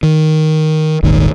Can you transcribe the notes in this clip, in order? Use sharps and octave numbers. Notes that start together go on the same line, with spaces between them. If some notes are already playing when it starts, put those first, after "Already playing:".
D#3
D#1 G#1 D#3